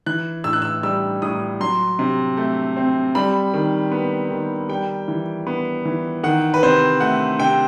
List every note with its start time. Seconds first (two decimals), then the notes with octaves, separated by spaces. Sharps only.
0.06 E3 F#6
0.44 A2 E6
0.53 F#6
0.62 E6
0.83 G3 E6
1.22 A2 D#6
1.60 F#3 C6
1.99 C3
2.37 A3
2.77 C4
3.15 G3 B5
3.54 D#3
3.92 B3
4.31 D#3
4.69 G3 G5
5.08 E3
5.47 B3
5.85 E3
6.23 D#3 F#5
6.54 B4
6.63 C3 C5
7.01 A3 F#5
7.39 C3 G5